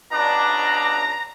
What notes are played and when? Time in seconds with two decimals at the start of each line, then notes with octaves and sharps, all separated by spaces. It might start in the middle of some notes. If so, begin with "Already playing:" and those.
0.12 C#2 B2 D4 A#5